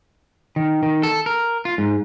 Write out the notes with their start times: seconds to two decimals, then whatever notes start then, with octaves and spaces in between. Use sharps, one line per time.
0.56 D#3
0.83 D#3
1.03 A4
1.26 A#4
1.65 F4
1.78 G#2